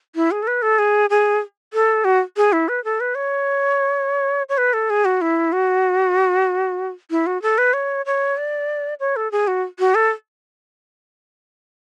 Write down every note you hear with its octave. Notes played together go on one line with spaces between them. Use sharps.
E4
G#4
A4
B4
A4
G#4
G#4
A4
F#4
G#4
E4
B4
A4
B4
C#5
C#5
B4
A4
G#4
F#4
E4
F#4
E4
F#4
A4
B4
C#5
C#5
D5
C#5
A4
G#4
F#4
F#4
A4